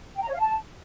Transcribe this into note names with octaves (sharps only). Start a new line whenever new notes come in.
G5
A#5
C#5
F5
A5